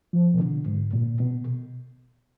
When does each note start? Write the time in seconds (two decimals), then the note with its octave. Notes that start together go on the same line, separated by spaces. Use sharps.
0.13 F3
0.34 B2
0.40 D3
0.66 G#2
0.93 A#2
1.20 B2